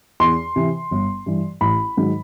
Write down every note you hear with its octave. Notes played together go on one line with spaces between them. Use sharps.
E2 C6
C3 E3
G1
G2 E3
A1 B5
G#2 D#3 F#3